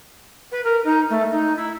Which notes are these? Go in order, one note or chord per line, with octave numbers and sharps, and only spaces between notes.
B4
A#4
D#4
A3
D#4
E4